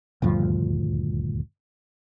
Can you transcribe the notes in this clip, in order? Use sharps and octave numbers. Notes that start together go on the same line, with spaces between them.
D#1 D2 G2 F3